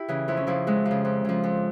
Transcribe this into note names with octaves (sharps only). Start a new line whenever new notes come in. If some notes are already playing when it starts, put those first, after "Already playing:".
Already playing: E4 G4
C#3 E3
F2 E4
C#4
C#3 F3 E4
F2 G#3
F3
C#3
F2
C#3 F3
F2